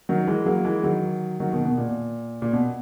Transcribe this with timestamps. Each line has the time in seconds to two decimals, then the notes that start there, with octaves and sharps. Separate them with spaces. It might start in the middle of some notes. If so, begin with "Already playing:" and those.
0.09 D#3 F#3
0.27 E3 G#3
0.46 F#3 A#3
0.65 E3 G#3
0.83 D#3 F#3
1.40 D#3 F#3
1.53 B2 D#3
1.65 B2
1.78 A#2
2.42 A#2
2.53 B2